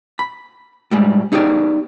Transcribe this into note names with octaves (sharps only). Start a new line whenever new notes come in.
B5
A2 G3 G#3
B3 D#4 G4 G#4 D5